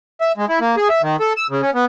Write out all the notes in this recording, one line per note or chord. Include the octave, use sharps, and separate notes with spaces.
E5
G#3
E4
A#3
G#4
E5
D#3
A4
E6
C#3
C#4
B3